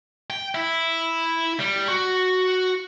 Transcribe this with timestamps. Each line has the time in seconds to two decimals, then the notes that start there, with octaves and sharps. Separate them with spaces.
0.30 G5
0.55 E4
1.60 G3
1.89 F#4